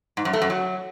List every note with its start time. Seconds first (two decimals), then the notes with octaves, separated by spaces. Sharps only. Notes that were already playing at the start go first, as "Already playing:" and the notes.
0.17 G#2
0.25 F#2
0.33 A3
0.42 F#2
0.50 F#3